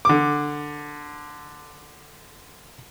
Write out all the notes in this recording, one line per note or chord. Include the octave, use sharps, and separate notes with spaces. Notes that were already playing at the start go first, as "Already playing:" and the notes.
D3 D6